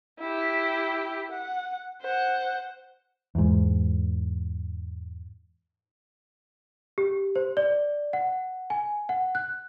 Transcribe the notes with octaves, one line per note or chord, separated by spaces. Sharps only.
E4 G4
F#5
C5 F#5
E2 G#2
G4
C5
D5
F#5
G#5
F#5
F#6